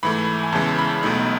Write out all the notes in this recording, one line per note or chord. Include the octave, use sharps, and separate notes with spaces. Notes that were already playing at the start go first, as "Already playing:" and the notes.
G#2 E3 A3 B5
G#5
E2 C#3 E3 G#3 A5
B5
B1 B2 A3 D#4